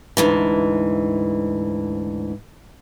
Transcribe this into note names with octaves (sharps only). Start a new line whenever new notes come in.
D2 G#2 E3